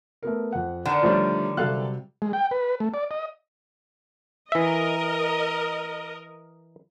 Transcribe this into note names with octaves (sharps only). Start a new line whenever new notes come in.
A3 B3 A#4
F2 F#5
D3 D#3 F#5 E7
F3 G3 A3 D4 C#5
C3 F#3 G3 A4 F5 F#6
G#3
G5
B4
A3
D5
D#5
E3 A#4 D#5 E5